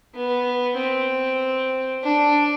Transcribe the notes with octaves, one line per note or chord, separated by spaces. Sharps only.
B3
C4
D4